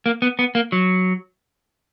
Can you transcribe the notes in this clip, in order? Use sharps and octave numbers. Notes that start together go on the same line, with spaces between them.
A#3
B3
B3
A#3
F#3